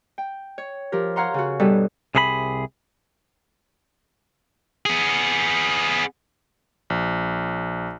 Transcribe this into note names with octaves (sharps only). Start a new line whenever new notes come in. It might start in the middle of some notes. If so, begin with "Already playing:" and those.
G5
C#5
F3 G4 A#4
C#5 F5 F#5 A#5 C6
C#3 F#4
G2 B2 G3 A4
C2 C3 G#4 A4 B5
B3 G#4
A#1